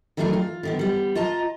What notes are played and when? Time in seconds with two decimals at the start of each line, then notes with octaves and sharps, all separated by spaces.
0.17 D#3 E3 F#3 A3 D4 G#4
0.33 F4
0.63 D3 D#3 B3
0.79 G3 B3
1.15 F4 D#5 A5 A#5